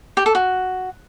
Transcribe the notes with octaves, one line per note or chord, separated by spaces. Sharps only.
G4
A4
F#4